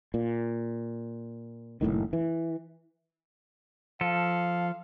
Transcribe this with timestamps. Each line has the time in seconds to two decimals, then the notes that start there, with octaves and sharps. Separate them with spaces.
0.14 A#2
1.81 F#1 B1 A2 D#3
2.13 E3
4.01 F3 A4 F5